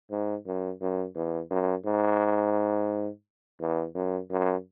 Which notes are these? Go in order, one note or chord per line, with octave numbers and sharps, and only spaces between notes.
G#2
F#2
F#2
E2
F#2
G#2
E2
F#2
F#2